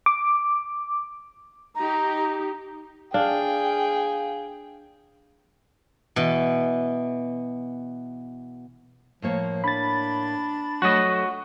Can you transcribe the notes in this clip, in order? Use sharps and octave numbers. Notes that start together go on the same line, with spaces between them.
D6
D#4 G4 A#5
D4 G#4 F5 G5
B2 E3
A2 F3 A#3 C#5
D4 B5 A6
F#3 A3 F#4 D#5